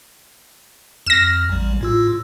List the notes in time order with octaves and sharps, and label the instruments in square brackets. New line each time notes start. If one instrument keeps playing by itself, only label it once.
[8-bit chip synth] F2 F6 [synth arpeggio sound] A#6 E7
[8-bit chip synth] A1 G3
A2 F4 E6